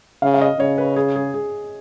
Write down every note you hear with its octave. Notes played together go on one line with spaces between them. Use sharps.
C#3 F5
F5
D#5
C#3 C#5
B4
G#4
G#4
G#4